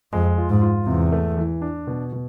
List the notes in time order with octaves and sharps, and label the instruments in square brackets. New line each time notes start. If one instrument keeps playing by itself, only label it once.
[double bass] F2 [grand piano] G#3
[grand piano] F4
[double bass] G#2
[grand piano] F4
[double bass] E2 [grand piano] C3
[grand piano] A3
E3
D4
B2
B2